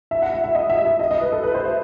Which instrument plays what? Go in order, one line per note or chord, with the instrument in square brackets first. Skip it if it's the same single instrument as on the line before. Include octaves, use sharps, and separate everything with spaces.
[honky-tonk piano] E5
F#5
E5
E5
D#5
E5
E5
D#5
D#5
B4
A4
B4
C5
E5